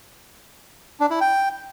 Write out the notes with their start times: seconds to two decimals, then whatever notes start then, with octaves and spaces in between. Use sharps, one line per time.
1.00 D4
1.10 E4
1.21 G5